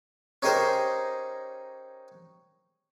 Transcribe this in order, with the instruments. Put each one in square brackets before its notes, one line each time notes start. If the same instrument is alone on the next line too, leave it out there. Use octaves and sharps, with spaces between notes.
[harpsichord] C#4 D#4 G4 G#4 A#4 C5